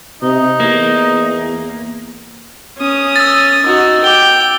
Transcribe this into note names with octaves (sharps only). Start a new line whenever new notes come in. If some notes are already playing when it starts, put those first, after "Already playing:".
C3 D#4
E2 A#3
C#4 D#6
E6 A6
D#4 F#4
G5 D6 F7 G7